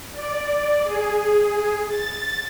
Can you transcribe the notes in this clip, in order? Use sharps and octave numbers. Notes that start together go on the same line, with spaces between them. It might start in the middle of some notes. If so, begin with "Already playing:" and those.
D5
G#4
A6